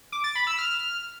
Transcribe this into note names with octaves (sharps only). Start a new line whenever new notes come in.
D6
A6
B5
E6
F6